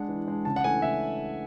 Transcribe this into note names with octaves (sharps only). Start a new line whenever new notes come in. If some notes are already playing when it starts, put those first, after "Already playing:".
Already playing: G#3 D4 F#5
E3
G#3 D4
C#3 A5
F#5
E3 A3 D4 G#5
C#3 E5